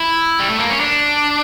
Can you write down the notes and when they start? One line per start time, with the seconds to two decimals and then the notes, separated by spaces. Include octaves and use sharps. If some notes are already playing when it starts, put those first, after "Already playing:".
Already playing: E4
0.40 G3
0.50 A3
0.60 A#3
0.70 C#4
0.80 D4